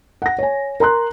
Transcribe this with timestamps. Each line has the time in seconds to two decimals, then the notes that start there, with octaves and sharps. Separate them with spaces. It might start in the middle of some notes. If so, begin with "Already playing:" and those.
0.22 F#5 A#6
0.38 C#5 G#5
0.80 A#4 A#5 C6 F#6